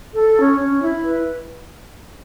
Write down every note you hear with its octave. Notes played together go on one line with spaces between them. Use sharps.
A4
C#4
C#4
E4
B4